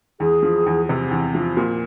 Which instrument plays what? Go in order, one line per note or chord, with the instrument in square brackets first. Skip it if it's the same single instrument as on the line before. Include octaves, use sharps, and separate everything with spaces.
[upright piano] E2 [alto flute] G#4
[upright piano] F3
E2
C3
E2
F3
A#2